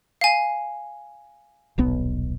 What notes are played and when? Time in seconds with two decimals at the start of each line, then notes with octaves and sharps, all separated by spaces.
0.21 F5 G#5
1.78 D#1 B1 B3